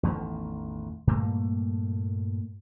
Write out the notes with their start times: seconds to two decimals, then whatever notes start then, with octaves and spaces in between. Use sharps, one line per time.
0.03 A1 E2 D#3 A3
1.07 G2 A#2 A3 A#3